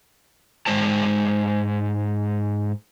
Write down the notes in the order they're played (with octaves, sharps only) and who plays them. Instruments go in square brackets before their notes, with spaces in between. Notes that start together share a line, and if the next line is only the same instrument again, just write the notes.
[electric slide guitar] G#2 C#3 G#3 C5 A5